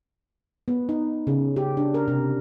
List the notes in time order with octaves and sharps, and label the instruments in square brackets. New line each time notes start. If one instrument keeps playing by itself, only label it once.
[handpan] B3
D#4
C#3
G4
D4
A#4
C3